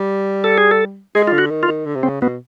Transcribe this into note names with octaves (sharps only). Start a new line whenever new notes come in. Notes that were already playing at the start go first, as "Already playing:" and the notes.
Already playing: G3
A4
G#4
A4
G#3 G#4
F4
D3
F#4
D#3
F4
D#3
D3
C3
C#3 C4
B2 B3